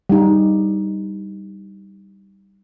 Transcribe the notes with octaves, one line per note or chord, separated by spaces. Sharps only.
G3 D#4